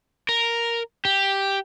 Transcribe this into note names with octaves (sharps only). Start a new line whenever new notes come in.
A#4
G4